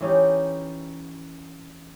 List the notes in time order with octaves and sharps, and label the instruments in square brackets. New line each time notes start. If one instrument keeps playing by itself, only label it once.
[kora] E3 C#4 D#4 G4